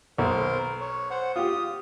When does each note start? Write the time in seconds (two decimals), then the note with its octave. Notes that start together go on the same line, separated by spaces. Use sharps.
0.18 B1 A#4 C5
0.81 C#5
1.11 C5 F#5
1.36 F4 G4 D#6